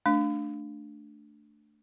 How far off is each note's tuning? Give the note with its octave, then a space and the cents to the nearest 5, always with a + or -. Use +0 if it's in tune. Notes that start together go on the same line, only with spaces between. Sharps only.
A3 +0 D4 +0